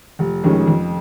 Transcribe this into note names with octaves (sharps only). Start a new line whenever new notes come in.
F1
F2 D#3 G#3 C#4
F2